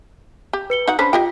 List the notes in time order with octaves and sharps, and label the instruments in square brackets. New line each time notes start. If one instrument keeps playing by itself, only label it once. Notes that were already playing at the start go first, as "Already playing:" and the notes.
[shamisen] G4
[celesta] B4 C#7 G7
[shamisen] D#4 F#4 F#5
[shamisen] C#4 D4 C5 [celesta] B5 B6
[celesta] F4 [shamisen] G4 D#5 G5